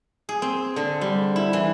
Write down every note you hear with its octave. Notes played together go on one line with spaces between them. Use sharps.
G#4
C4
D3
G3
E4
E3